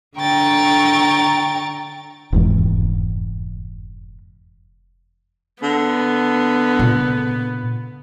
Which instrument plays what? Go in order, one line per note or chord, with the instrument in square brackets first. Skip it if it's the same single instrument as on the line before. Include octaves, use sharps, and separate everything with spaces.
[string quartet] D3 G5 A#5 C#6 A6
[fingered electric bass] F1 E2 G#2
[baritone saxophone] D3 [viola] B3
[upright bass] A#2 C#3